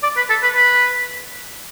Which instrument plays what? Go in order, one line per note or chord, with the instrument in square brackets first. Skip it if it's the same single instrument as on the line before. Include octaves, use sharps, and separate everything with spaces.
[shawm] D5
B4
A4
B4
B4